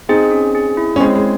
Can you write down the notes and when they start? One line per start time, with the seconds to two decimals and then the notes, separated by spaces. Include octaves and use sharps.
0.09 C4 D#4 G#4
0.31 C#4
0.55 G#4
0.77 E4
0.96 C#4
1.00 G#3 C4 C#5
1.15 G#3